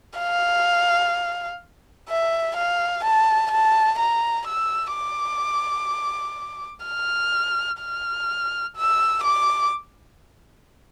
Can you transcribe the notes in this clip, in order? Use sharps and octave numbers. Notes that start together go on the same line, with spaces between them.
F5
E5
F5
A5
A5
A#5
E6
D6
F6
F6
E6
D6